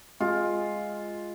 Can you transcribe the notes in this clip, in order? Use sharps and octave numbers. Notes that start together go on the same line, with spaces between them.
G#3 F4